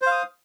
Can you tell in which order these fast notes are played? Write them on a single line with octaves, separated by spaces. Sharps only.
C5 F5 D#6